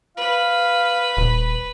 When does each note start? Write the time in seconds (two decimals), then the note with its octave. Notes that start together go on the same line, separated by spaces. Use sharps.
0.17 B4 F5
1.17 D#1